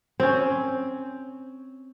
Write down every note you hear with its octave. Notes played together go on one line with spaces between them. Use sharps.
C4 C#4